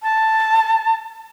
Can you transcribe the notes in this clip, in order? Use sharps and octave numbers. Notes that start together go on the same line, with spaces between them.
A5